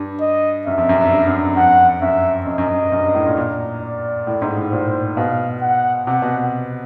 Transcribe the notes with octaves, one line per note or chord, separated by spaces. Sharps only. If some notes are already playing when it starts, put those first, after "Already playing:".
Already playing: G2
D#5
F#2 E5
F2
F#2
G2
G2
F#2
F2
F2 F#5
F#2 E5
F#2 D#5
F#2
F#2
G2
F#2
G2
A2
A#2
A#2
D5
A2
G#2
A2
A#2 C5
B2 F5
F#5
C3 F#5
B2